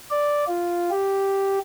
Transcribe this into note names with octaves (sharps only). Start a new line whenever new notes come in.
D5
F4
G4